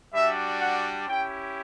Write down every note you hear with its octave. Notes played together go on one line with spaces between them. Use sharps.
G3 D4 F#4 E5
F#5
C#4 E4 G4 G5